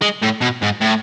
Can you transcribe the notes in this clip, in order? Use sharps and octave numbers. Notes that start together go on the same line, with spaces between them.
G#3
A2
B2
G#2
A2